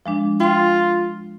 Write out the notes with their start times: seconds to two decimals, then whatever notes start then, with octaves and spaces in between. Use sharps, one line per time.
0.06 F3 G#3 D4
0.40 F4 G5 C6